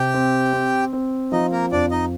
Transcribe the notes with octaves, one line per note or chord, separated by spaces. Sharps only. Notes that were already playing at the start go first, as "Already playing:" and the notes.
Already playing: C3 G4 G5
C4
C4
C4
F3 D#4 D#5
A#3 A#4
F2 D4 D5
D#4 D#5